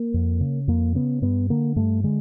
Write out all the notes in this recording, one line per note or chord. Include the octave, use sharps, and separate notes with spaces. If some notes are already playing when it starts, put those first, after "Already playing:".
Already playing: A#3
F2
C#3
F2 A#3
C#3 B3
G2 B3
D3 A#3
G2 A3
D3 G#3